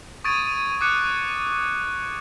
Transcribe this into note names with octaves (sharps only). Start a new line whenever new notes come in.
C#6 D#6 G#6 A6 D7 D#7
D6 D#6 F#6 C#7